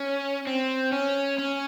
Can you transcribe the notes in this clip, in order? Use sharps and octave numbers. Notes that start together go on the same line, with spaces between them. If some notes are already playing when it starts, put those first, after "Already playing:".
Already playing: C#4
C4
C#4
C#4